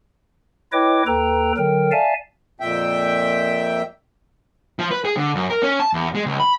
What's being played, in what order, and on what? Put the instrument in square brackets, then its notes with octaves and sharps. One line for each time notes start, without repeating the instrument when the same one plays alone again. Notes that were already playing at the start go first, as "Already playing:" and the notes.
[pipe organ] E4 B4 C#5 D#5 G5 D6
D#2 A4 B4 G5 A#5
D3 F#3 A#4 G5
D5 E5 F5 G#5 A5
[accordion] F2 A#2 E5 G5
[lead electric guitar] F3
B4
G#4
D3
F#2
A#4
C#4
A5
E2
G#3
C#2
B5